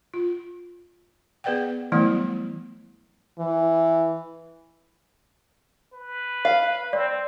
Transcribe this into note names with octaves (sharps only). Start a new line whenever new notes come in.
F4
B3 G#4 B4 D5 F#5 G5
E3 F#3 G3 A3 B3 E4
E3
B4
F5
C4 D5